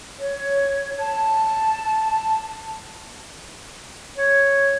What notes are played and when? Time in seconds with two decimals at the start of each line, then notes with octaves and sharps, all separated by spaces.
0.19 C#5
0.99 A5
4.18 C#5